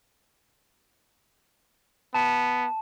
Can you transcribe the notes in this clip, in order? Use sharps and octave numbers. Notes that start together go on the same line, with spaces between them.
B3 A5